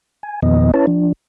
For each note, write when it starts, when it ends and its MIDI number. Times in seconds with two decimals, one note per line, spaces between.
0.23 0.40 80
0.42 0.71 40
0.42 0.71 46
0.42 0.71 51
0.42 0.71 53
0.42 0.71 59
0.42 0.71 75
0.74 0.86 61
0.74 0.86 64
0.74 0.86 71
0.74 0.86 73
0.74 0.86 81
0.87 1.12 53
0.87 1.12 62